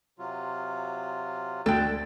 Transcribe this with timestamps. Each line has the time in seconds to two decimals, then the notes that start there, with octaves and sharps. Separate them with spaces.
0.19 C3 F#3 F4
1.66 D2 A4 G5 F#6